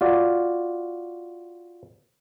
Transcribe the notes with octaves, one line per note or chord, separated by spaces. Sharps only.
F4 F#4 D5